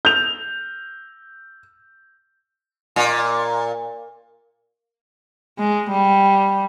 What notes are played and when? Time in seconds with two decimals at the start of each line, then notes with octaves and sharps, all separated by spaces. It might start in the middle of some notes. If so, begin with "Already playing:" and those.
0.05 G6 F7
2.96 A#2
5.58 G#3
5.91 G3